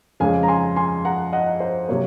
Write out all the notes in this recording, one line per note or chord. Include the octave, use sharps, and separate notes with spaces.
F2 C#3 G#3 C#4 F5 G#5
A#5
G#5 C6
G#5 C6
F#5 A#5
D#5 F#5
C5
C3 F#3 A#3 C#5